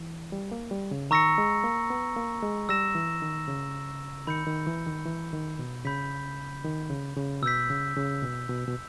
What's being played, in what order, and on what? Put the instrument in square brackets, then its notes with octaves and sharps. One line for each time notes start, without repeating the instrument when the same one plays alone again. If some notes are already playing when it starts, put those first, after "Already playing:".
Already playing: [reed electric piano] E3
G3
A#3
G3
C#3
[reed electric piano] D#3 [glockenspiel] A#5 C#6 E6 A#6 C#7
[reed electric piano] G#3
A#3
B3
A#3
G#3
[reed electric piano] G3 [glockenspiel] E6 A#6 E7
[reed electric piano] E3
D#3
C#3
[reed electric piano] D#3 [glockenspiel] B5 G6 C#7
[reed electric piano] D#3
E3
D#3
E3
D#3
B2
[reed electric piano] C#3 [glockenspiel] B5 G6 B6
[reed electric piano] D#3
C#3
C#3
[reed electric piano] B2 [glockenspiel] E6 G6 B6
[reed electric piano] C#3
C#3
B2
B2
B2